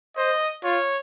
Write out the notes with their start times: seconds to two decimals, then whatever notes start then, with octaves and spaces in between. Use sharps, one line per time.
0.17 C5 D#5
0.64 F4 C#5